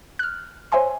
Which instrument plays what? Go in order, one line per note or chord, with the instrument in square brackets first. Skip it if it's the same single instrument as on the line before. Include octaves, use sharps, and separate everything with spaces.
[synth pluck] F6 F#6
C5 C#5 E5 G#5 C6